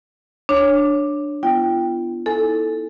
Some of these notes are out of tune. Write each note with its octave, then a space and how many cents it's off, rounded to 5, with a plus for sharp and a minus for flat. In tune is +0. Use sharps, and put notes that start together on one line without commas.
D4 +5 C#5 +0
B3 +0 F4 -40 G5 +0
E4 -30 A4 +0 G#5 +0